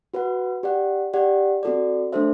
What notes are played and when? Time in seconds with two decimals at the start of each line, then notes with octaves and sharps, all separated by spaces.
0.14 F#4 B4 F#5
0.63 G4 D5 F#5
1.14 G4 D5 F#5
1.63 C4 F#4 A4 D5
2.12 A3 D4 A4 C5 E5